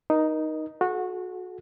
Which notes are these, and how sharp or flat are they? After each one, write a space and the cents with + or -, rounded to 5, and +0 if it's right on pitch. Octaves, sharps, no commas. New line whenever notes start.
D#4 +0 A#4 +35
F#4 -20 A4 -45